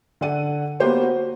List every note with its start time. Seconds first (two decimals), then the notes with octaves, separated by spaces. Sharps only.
0.21 D3 A4 D5 F#5 D#7
0.80 A#3 B3 F#4 G4 C5 C#5
1.03 F#4